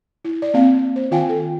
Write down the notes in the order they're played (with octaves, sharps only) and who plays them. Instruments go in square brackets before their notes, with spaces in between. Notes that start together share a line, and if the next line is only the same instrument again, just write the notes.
[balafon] E4
D5
A#3 C4 F5
C5
D#3 F4 F5 G5 G#5
A4